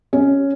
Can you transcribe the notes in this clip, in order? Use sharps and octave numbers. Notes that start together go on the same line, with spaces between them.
C#4